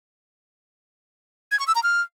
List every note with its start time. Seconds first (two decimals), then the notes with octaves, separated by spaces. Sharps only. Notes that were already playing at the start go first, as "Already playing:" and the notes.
1.52 G#6
1.59 C#6
1.67 E6
1.75 A#5
1.83 F6